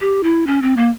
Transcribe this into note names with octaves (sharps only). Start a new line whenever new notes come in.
G4
E4
C#4
C4
A#3